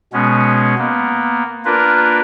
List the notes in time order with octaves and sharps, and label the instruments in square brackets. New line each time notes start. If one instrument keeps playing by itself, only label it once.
[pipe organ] B2 G#3 B3 C#4
A#3 B3
A#3 D4 F4 A#4 B4